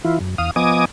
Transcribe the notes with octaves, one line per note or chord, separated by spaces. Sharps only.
E3 E4 F4
F#2
E2 F5 D#6
F3 B3 D#5 G#5 D6 D#6